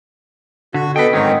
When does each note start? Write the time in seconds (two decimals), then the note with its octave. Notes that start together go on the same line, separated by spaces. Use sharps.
0.74 D3 F#4
0.96 B2 A4 B4 D#5 G5
1.13 G#2 D#3 F#3 C4 C#4 D#4